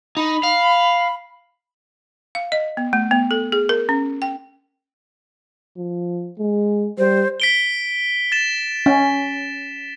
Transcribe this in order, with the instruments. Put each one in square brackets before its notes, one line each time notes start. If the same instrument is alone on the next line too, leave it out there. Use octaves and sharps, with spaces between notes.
[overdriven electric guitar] D#4 [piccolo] B5
[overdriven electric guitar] F5
[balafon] F5
D#5
B3
A3
B3
A4
G#4
A#4
C#4
G5
[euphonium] F3
G#3
[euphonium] G3 [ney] C5
[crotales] B6 D7 G7
A6 E7
[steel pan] C#4